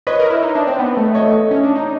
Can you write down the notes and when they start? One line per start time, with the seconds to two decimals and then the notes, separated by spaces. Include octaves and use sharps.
0.07 B4 C#5 D#5
0.19 A#4
0.30 E4
0.42 D#4
0.55 D4
0.67 C4
0.79 B3
0.97 A3
1.15 C#5 D#5
1.51 C#4
1.63 D4
1.75 D#4